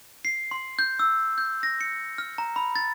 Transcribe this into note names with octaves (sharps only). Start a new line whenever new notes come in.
C7
C6
G6
E6
G6
A#6
C#7
F6
A#5
B5
A6